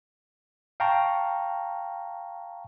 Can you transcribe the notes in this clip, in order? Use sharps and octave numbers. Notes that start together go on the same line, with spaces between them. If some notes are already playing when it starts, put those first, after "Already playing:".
F5 G5 A5 A#5 C#6